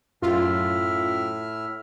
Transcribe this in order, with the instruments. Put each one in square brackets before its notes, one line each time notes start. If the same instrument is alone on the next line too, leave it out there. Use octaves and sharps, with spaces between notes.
[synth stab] F#2 F4 [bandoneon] A2 E5 F6